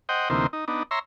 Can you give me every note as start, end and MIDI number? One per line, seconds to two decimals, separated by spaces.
0.09 0.29 72
0.09 0.29 75
0.09 0.29 78
0.09 0.29 79
0.30 0.47 38
0.30 0.47 48
0.30 0.47 52
0.30 0.47 58
0.30 0.47 63
0.30 0.47 72
0.53 0.65 63
0.68 0.83 59
0.68 0.83 62
0.68 0.83 63
0.91 0.99 73
0.91 0.99 76
0.91 0.99 82
0.91 0.99 84